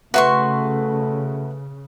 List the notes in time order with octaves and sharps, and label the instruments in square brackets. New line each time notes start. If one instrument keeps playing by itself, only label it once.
[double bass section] C#3 [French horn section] A3 [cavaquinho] F#4 C6 C#6 [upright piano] B4 E5